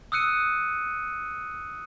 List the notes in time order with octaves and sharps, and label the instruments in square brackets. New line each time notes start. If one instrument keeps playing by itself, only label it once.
[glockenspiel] D#6 E6 F#6 C#7 D#7